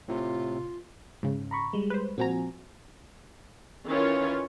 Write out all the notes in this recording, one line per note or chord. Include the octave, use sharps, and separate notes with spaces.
A2 C3 F4
G#2 C#3
A#5 B5 C#6
G3 G#3
B4 C5
A#2 F3 C4 F#4 G#5 A#5
D#3 E3 C#4 F4 C#5